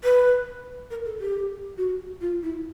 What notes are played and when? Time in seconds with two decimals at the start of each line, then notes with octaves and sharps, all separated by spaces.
0.04 B4
0.91 A#4
1.05 A4
1.20 G4
1.78 F#4
2.21 F4
2.43 E4